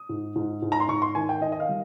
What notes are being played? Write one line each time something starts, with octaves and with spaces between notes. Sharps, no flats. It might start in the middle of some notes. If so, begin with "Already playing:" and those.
Already playing: D#6
G#2
G#2
G#2
A#5
C6
G#2 C#6
C6
D#3 G#5
G5
D#3 D#5
D#5
F5
G3